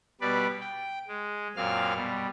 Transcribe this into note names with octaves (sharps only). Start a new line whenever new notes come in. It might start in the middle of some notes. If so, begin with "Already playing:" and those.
B2 G3 B4 D5
G5
G#3
F#2 A#2 C4 F5 F6
B2 G3